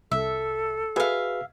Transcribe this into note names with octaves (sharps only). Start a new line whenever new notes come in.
C2 A4 E5
F#4 G#4 B4 E5 F5